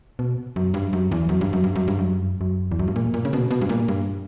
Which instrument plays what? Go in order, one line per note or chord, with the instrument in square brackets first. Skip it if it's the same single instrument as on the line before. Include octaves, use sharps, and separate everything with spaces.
[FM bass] B2
F#2
G2
F#2
E2
F#2
G2
F#2
G2
F#2
G2
F#2
F#2
E2
F#2
G2
A#2
A#2
C#3
B2
B2
G2
A#2
G2